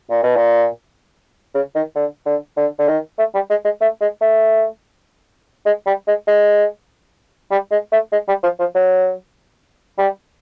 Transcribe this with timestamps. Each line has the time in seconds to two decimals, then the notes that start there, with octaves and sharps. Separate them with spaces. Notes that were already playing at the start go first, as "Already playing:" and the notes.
0.10 A#2
0.23 B2
0.36 A#2
1.55 C#3
1.75 D#3
1.95 D3
2.26 D3
2.57 D3
2.79 D3
2.88 D#3
3.18 A3
3.34 G3
3.50 G#3
3.65 G#3
3.81 A3
4.01 G#3
4.21 A3
5.66 G#3
5.86 G3
6.07 G#3
6.27 G#3
7.51 G3
7.71 G#3
7.92 A3
8.12 G#3
8.28 G3
8.43 F3
8.59 F3
8.75 F#3
9.98 G3